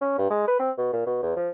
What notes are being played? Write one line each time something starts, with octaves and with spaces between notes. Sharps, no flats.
C#4
G2
G#3
B4
C4
B2
A#2
B2
E2
F3